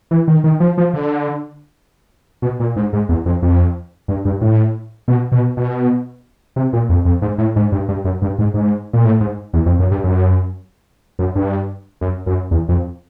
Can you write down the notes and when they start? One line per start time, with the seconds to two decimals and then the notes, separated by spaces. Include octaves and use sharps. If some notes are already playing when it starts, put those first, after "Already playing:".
0.11 E3
0.28 D#3
0.44 D#3
0.60 F3
0.78 F3
0.93 D3
2.42 B2
2.60 A#2
2.76 G#2
2.93 G#2
3.09 E2
3.26 F2
3.42 F2
4.08 G2
4.25 G2
4.41 A2
5.08 B2
5.32 B2
5.57 B2
6.56 C3
6.73 A#2
6.89 F2
7.05 F2
7.22 G#2
7.38 A2
7.56 G#2
7.72 G2
7.88 G2
8.05 F#2
8.22 G2
8.39 G#2
8.54 G#2
8.93 A#2
9.05 A2
9.20 G#2
9.53 E2
9.66 F2
9.79 F#2
9.91 G2
10.04 F#2
11.19 F#2
11.35 G2
12.01 F#2
12.26 F#2
12.51 E2
12.69 F2